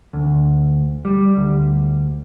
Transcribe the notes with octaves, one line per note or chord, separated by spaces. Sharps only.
D2
G3
D2